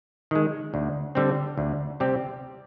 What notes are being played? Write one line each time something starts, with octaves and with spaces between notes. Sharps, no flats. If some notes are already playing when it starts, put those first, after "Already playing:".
D#3 G#3
D2
D3 G3 C4
D2
C3 G3 C4 G4